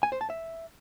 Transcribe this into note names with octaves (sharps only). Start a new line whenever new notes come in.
G#5
C5
A5
E5